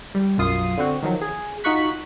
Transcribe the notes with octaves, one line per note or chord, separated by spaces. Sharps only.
G3
B1 F#2 F4 D#6 C7
D3 C4 F#4
D#3 F3 F#3
G#4
D#4 F4 F#4 C#6 F#6 B6